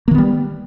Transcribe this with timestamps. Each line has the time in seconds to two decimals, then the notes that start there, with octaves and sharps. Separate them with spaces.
0.08 A#3
0.11 D#3
0.15 B3
0.18 G3